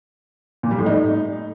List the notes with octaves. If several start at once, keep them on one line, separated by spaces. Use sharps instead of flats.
A#2
G3
A2
D#4